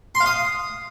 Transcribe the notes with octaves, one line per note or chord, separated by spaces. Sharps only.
C6
F5
D#6